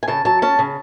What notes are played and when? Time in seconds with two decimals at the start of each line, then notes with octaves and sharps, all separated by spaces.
0.03 G#5
0.08 C#3 A5
0.25 F#3 A5
0.42 C#4 A5
0.59 C#3